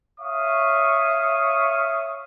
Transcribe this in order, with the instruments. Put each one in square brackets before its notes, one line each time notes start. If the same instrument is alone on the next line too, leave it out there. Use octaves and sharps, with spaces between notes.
[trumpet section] C#5 E5 F5 C#6 D#6